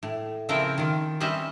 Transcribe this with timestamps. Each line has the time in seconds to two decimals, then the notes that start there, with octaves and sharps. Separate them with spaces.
0.03 A2
0.49 C#3 F3 C4 E4 A#4 G5
0.78 D#3 F4
1.20 G3 C4 C#4 B4 D#5 E5